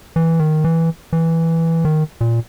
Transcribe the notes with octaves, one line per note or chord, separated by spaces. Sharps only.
E3
D#3
E3
E3
D#3
A#2